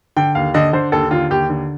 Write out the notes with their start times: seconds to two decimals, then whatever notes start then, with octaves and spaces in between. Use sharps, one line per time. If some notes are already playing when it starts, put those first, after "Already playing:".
0.17 D3 G5
0.35 D#2 F5
0.54 D3 D#5
0.73 D3 C5
0.92 D#2 A4
1.11 D3 F4
1.30 D#2 G4
1.50 D3